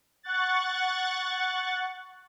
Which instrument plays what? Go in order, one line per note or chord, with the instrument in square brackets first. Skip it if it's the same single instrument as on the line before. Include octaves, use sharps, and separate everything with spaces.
[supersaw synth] F#5 C#6 F#6 A6